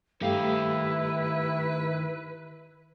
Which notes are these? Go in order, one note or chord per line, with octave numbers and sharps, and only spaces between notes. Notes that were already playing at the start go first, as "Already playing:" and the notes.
G2 D#3 A3 E4 G4 B4 F5